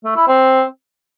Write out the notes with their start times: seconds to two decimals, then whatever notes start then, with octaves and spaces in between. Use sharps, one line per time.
0.04 A3
0.16 E4
0.28 C4